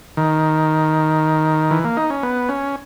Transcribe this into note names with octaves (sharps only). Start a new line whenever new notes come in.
D#3
E3
A#3
D#4
C#4
B3
C#4